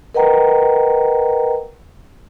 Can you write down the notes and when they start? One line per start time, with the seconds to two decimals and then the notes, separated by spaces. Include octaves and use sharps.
0.14 A#4 B4 D#5 F#5 G5 A#5